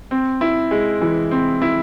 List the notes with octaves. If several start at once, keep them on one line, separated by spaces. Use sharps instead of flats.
C4
E4
G#3
E3
C4
E4